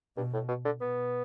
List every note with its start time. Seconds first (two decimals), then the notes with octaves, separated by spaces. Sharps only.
0.17 G2 B2
0.34 A2
0.48 B2
0.65 D3
0.80 B2 B3